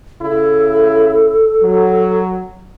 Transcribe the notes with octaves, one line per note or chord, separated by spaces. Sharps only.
C#3 E4 A4
F#3